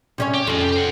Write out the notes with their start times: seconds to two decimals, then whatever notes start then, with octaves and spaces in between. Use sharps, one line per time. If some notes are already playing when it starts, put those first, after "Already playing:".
0.18 C3 C#4 C#5
0.34 G4
0.47 F2 A2 C#4
0.64 G4
0.76 C5 F#5